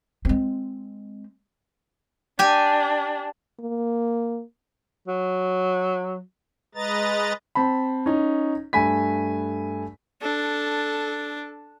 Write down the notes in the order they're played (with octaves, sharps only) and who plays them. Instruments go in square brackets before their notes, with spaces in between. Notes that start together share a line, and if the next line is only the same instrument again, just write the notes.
[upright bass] G#3 C4
[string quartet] D4 [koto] G4 G#5
[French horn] A#3
[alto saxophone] F#3
[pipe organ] G#3 B4 D#5 A#5 A6
[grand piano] C4 A5 B5
C#4 D#4
G2 A3 G#5 B5 B6
[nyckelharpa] D4 [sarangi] A4